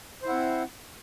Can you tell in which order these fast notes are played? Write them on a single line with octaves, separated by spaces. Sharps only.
C5 E4 F#5 C4